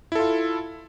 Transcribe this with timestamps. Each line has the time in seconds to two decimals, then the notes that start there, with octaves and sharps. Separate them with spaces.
0.12 E4
0.15 A4
0.19 F4